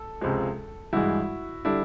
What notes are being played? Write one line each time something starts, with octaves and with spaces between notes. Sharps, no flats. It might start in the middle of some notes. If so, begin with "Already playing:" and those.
Already playing: A4
C#2 C3 F3 G#3
G2 E3 G#3 E4 F#4
D3 G3 D4 E4